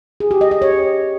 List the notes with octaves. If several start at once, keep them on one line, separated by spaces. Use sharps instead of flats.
G#4
G4
D#5
D#5
C#5